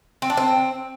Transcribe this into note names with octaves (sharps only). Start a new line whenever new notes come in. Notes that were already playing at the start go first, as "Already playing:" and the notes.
C4
D4
C4